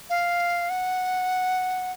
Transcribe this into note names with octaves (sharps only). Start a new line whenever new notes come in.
F5
F#5